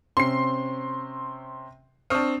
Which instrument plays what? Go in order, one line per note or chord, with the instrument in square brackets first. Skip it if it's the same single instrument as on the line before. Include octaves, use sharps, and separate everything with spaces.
[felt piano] C3 C4 C#4 [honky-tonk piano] C6 C7
[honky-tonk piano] C4 D4 [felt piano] C#6 D#6 F6